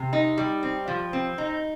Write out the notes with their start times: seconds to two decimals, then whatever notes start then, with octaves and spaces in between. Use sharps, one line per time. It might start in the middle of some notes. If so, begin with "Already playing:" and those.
Already playing: C3
0.13 D#4
0.38 G3
0.63 C4
0.88 F3
1.13 C4
1.38 D#4